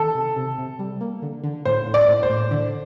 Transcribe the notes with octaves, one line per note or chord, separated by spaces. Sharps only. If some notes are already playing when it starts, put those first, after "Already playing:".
Already playing: D#3 A4
C3
C3
C3
G3
A#3
D3
D3
A2 C5
A2
D5
A2
C5
A2
D3